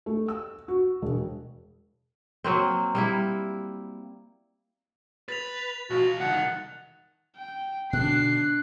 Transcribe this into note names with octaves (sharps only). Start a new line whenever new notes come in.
A3
E6
F#4
E1
F#3 A#3 C4
G3 A#3 E4
B4 A6 F7
B1 F4 F#4
C2 D#3 F#5
G5
B2 D3 D#3 D4 F#6 C7